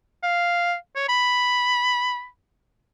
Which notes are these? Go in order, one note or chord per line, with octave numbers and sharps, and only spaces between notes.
F5
C#5
B5